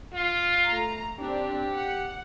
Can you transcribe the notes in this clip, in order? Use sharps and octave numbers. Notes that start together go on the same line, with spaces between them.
F4
A3 A#5
C4 D4 G4
F#5